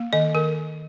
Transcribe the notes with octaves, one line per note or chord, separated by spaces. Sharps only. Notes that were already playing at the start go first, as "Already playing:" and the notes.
Already playing: A#3
D#3 D#5
D#3 A#4